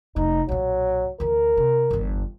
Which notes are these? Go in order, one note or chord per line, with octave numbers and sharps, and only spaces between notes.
F1 A3 D#4
B1 A#2 F#3
D2 E3 A#4
C3
G1 E2